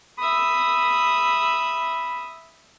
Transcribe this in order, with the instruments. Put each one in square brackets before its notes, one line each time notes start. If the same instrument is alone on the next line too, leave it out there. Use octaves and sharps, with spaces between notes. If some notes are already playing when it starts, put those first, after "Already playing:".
[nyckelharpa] E5 D#6 [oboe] B5